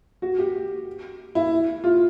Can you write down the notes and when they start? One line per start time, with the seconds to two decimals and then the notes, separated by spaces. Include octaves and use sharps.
0.22 F#4
0.39 G4
1.35 E4
1.84 F4